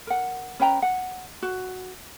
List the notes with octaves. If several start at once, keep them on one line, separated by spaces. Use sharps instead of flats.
A#4 F#5
C#4 B4 G5 A#5
F#5
F#4